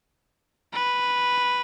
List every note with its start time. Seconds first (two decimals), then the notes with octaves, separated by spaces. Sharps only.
0.73 B4